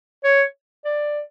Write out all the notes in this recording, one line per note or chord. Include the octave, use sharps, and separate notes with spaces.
C#5
D5